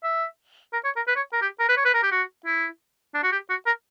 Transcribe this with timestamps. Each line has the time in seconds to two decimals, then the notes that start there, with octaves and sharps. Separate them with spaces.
0.03 E5
0.73 A#4
0.84 C#5
0.96 A#4
1.07 B4
1.16 C#5
1.33 A#4
1.42 G4
1.59 A#4
1.69 B4
1.77 C#5
1.85 B4
1.94 A#4
2.03 G4
2.11 F#4
2.46 E4
3.14 D4
3.23 F#4
3.32 G4
3.49 F#4
3.66 A#4